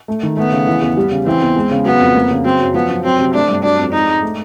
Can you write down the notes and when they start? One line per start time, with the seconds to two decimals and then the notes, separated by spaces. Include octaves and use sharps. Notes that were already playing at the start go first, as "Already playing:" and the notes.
0.08 A3
0.23 D#3
0.37 A3 B3
0.52 C#3
0.67 E3
0.81 E2
0.97 G3
1.11 C#3
1.26 E3 C4
1.42 E2
1.56 G#3
1.71 C#3
1.85 F#3 B3
2.00 F2
2.16 A#3
2.30 C#3
2.45 F#3 C4
2.60 F#2
2.74 F3 B3
2.90 F#2
3.04 F#3 C4
3.19 C3
3.34 A3 D4
3.49 G2
3.63 F#3 D4
3.79 F2
3.93 G#3 D#4
4.08 G#2
4.22 A3